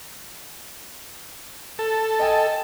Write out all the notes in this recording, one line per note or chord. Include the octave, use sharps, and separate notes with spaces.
A4
D#5 G5 G#5